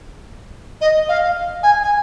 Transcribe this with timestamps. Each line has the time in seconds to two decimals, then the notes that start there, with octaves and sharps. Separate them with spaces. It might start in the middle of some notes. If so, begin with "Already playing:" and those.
0.81 D#5
1.09 F5
1.63 G#5
1.83 G#5